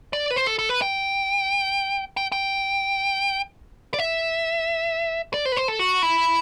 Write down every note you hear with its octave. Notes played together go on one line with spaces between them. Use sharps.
D5
B4
C5
A4
A4
B4
G5
G5
G5
D5
E5
D5
C5
B4
C5
A4
F#4
E4